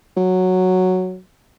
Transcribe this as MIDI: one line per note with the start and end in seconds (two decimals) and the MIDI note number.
0.17 1.19 54